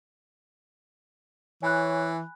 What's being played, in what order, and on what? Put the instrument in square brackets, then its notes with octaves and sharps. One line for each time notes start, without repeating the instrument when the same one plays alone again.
[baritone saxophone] E3 [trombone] C#5 [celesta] G#5 B5 F#6